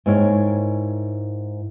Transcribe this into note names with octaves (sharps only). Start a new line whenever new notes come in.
G#2 E4 A#4 C#5 G5